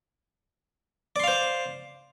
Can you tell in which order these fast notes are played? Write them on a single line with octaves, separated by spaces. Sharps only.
D5 C6 F5 C5